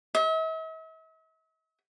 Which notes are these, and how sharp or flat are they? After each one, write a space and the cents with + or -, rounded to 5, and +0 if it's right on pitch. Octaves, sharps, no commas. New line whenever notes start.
E5 -45